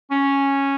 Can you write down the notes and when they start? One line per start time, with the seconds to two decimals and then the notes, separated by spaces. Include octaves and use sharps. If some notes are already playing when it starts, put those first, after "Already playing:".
0.11 C#4